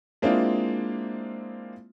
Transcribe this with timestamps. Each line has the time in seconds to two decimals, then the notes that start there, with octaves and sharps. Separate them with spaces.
0.22 G#3 A#3 C4 D4 E4 F4